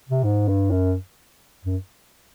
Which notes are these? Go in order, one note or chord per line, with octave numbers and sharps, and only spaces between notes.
C3
G#2
G2
F#2
F#2